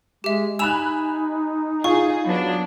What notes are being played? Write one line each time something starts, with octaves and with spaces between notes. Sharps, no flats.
G#3 G4 E5
D#4 G#5 B5 E6 F#6 E7 F7
F4 G#4 C#6
F#3 B3 D4